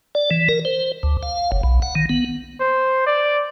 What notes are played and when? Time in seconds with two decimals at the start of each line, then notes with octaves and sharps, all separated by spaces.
0.15 D5
0.31 E3
0.49 A#4
0.65 C5
1.03 D2
1.23 F5
1.52 F#1
1.63 B1
1.82 F#5
1.95 D#3
2.09 B3
2.60 C5
3.06 D5